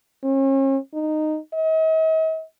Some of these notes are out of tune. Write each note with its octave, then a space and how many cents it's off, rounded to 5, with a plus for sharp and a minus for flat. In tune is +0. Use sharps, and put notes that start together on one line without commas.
C#4 -40
D#4 -10
D#5 +45